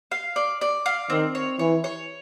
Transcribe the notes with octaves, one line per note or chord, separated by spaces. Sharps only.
F5
D5
D5
F5
D#3 C4
C#5
E3 C#5
C#5